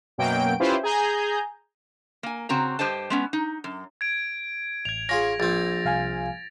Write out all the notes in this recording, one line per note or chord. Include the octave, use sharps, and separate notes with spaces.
F#2 B2 F#3 A#3 G5 D7
C#4 E4 F4 G4 B4 C5
G#4 G#5 A#5 G6
A#3 G#5
C#3 C4 F#4 A#5
G2 G4 C5 D#5 A5
G#3 B3 C#4
D#4
F#2
G#6 D7
A1 G#6 F7
C#4 F4 G#4 A#6
A#1 C4 A6
C2 F5 G#5